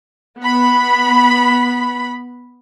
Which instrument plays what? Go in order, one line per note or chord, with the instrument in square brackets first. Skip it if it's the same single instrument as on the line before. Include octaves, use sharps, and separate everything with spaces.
[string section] B3 B5